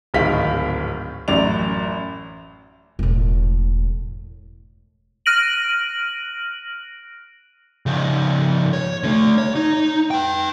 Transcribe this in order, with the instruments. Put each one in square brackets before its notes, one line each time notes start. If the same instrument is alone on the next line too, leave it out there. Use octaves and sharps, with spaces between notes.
[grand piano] D1 G#1 G#2 D#3 F5 B6
A1 F#2 D5 F7
[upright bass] E1 A2
[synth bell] F6 F#6 A#6 D7 D#7 F#7
[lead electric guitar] C#3 F3
C#5
D3 A3
C#5
D#4
B4 G5